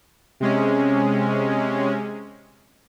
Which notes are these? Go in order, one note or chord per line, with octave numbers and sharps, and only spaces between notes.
C3 G#3 C#4